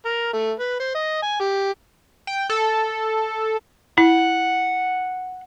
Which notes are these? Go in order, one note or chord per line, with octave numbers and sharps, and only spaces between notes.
A#4
A3
B4
C5
D#5
G#5
G4
G5
A4
E4 F#5